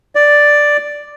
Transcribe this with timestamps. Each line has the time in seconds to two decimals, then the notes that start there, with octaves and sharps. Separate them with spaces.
0.15 D5